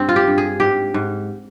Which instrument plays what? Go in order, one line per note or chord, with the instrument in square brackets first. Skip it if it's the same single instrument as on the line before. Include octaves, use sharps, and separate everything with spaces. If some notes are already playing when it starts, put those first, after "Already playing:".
Already playing: [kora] G2 C4
F4
G4
G2
G#4
G#2 G4
G#2